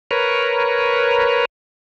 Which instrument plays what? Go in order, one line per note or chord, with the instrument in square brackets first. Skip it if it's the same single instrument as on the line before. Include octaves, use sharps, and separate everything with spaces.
[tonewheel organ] A#4 B4 C#5